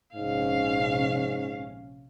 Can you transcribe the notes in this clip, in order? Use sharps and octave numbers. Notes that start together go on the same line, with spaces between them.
A#1 G#2 C3 C#4 F5